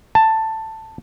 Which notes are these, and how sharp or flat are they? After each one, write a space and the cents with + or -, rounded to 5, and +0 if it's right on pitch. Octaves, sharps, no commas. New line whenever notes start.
A5 +10